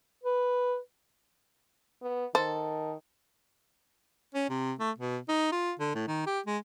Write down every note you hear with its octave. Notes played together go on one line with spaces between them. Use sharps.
B4
B3
D#3 A4 C5
C#4
C3
A3
B2
D#4
F4
D3
A2
D#3
G4
G#3